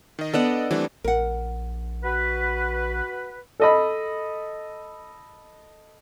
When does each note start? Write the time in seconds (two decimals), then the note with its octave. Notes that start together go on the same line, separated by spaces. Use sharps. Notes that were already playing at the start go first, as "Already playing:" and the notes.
0.19 D#3 D#5
0.34 B3 D4 A4 D5 D#5 F#5
0.71 E3 G3 A3 C4 D4
1.04 A#1 A#4 F#5
2.04 F#4 B4
3.60 A4 D#5 B5